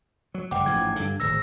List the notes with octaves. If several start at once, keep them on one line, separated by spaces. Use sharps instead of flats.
F#3
F#1 G3 F#5 G5 D6
A1 G#2 F3 G#6
G2 D3
D1 G#1 E6 A#6